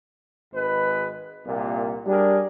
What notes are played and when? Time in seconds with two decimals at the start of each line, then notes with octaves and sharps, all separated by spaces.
0.53 G#1 G#3 B4
1.45 C2 A#2
2.07 G3 D4 G#4 A#4